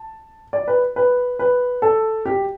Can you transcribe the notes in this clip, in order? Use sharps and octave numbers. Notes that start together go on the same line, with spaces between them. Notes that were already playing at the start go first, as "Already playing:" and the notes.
Already playing: A5
D5
B4
B4
B4
A4
G4